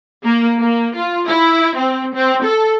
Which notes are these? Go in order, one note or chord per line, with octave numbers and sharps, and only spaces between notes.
A#3
A#3
F4
E4
C4
C4
A4